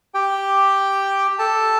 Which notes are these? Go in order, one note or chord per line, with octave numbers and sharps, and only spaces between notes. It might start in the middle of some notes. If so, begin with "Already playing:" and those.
G4 G5
A4 A5